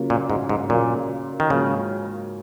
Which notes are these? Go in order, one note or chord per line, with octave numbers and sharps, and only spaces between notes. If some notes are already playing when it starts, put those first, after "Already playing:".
Already playing: C#3 F#3 A#3 F4 A#4
A#2
G#2
G#2
A#2 C#3 F#3 A#3 F4 A#4
D#3
G#2 C#3 F#3 A#3 F4 A#4